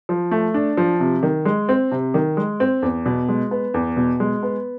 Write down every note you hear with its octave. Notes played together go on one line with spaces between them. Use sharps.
F3
A3
D4
F3
C3
D#3
G#3
C4
C3
D#3
G#3
C4
E2
B2
G#3
B3
E2
B2
G#3
B3